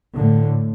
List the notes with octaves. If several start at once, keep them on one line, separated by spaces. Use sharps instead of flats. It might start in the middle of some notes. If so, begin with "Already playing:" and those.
A2 D3